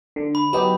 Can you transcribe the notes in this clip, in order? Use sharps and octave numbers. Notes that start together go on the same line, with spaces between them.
D3
B5
F#3 B3 D#4 G4 B5